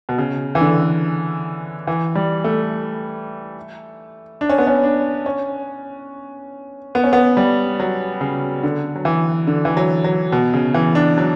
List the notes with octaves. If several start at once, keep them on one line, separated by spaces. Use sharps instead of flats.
B2
C#3
E3
D3
E3
G3
A3
D4
C#4
B3
C#4
D4
C#4
B3
C#4
B3
G3
F#3
C#3
D3
F#3
E3
D3
E3
F#3
F#3
B2
C#3
E3
D4
F#3